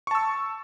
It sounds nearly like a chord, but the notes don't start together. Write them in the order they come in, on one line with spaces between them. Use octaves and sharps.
C#6 A5 E6